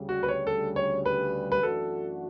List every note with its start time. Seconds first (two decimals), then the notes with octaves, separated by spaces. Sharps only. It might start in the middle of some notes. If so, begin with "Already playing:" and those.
Already playing: D2 C#3 G3
0.09 F#4
0.23 B4
0.28 C#5
0.47 A4
0.76 C#5
1.06 B4
1.52 B4
1.63 F#2 E3 A3 D4 F#4 A4